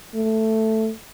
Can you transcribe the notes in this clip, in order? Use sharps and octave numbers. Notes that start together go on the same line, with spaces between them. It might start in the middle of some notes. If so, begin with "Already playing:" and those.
A3